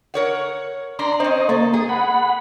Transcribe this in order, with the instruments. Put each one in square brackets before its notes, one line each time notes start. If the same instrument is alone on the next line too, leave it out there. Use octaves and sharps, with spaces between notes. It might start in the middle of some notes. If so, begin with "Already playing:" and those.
[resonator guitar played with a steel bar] A#4 C#5 F#5
[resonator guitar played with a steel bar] D4 [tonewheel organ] A#5 C6
[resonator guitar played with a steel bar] C4 C#4 [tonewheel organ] C5 D#5
[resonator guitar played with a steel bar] C#3 A4 [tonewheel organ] A#3
[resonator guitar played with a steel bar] G#4
[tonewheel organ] F#5 B5